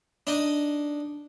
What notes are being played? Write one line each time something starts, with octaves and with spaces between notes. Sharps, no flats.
D4 D#4